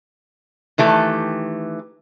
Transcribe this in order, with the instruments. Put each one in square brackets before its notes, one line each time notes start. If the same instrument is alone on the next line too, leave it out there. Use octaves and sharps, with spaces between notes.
[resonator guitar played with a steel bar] D#3 E3 A3 G4